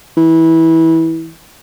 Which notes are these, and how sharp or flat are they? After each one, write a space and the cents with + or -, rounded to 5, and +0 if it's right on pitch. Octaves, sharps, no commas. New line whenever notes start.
E3 -20